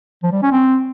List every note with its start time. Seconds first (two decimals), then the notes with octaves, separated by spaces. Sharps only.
0.23 F3
0.32 G3
0.42 C#4
0.52 C4